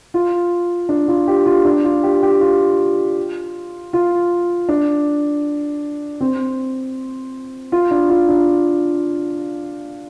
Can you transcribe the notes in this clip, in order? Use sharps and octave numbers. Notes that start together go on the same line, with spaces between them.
F4
D4
F4
G4
F4
D4
F4
G4
G4
F4
F4
D4
C4
F4
D4
F4
D4